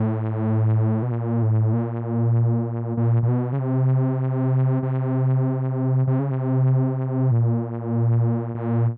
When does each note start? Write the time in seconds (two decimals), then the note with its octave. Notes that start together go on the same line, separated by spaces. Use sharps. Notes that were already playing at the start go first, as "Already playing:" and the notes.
Already playing: A2
1.03 B2
1.11 A#2
1.42 A2
1.73 A#2
2.97 A#2
3.23 A#2
3.28 B2
3.53 C#3
3.59 C3
4.83 C3
6.07 C3
6.19 C#3
6.31 C3
7.31 A#2
8.55 A#2